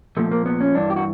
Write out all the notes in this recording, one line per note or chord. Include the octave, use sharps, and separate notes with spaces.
A#2 F3 A3
A#3
B3
C#4
G2 E3 D4
G4
F#4